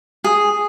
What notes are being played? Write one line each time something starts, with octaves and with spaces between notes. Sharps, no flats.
G#4